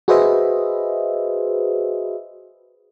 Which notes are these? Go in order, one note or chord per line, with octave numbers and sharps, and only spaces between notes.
F#4 G#4 B4 C5 D#5 E5